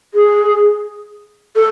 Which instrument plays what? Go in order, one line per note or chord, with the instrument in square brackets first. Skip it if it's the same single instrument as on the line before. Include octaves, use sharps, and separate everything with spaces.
[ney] G#4
A4